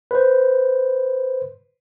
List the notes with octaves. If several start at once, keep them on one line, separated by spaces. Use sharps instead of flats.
B4 C5